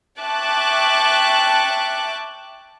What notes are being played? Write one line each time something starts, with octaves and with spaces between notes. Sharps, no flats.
E5 G5 A5 C#6 D6 F#6